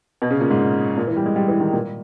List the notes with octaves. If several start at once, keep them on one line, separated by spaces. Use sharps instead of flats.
B2
C#3
A#2
G#2
A#2
E3
G3
G#3
G3
E3
D#3
A#2